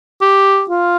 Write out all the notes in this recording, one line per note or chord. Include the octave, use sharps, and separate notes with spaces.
G4
F4